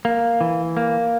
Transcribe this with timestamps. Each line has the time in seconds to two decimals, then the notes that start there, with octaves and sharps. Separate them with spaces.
0.05 A#3
0.41 E3
0.77 A#3